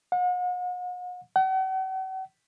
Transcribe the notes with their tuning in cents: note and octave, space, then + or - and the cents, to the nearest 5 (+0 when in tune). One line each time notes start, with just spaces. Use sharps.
F#5 -40
F#5 +45